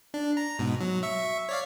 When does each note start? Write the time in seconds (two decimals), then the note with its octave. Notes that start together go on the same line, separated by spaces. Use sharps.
0.14 D4
0.37 A#5
0.59 G#2 B2
0.80 F#3
1.03 E5 C#6
1.49 C#5 D5 F5